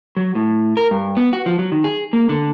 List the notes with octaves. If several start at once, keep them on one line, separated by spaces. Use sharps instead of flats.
F#3
A2
A#4
G2
B3
F#4
F3
F#3
D#3
G#4
A#3
D3